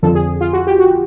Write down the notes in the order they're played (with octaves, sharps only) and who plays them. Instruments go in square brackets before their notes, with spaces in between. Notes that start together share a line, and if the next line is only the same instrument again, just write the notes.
[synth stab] F2 D3 F3 A4
G#4
F4
F#4
G4
F#4